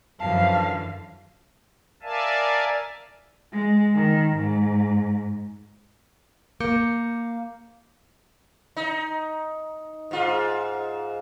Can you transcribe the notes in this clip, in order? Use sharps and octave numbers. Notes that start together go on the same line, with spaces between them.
F#2 D3 E3 F3 F5 A5
A#4 D5 E5 F5 G#5 A5
G#3
D#3
G#2
A#3 D6 G6 C#7
D#4
G#2 F4